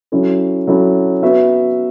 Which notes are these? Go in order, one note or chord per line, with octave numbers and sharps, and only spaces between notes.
F#3 C#4 E4 A4
F#3 C#4 E4 A4
B3 F#4 B4 E5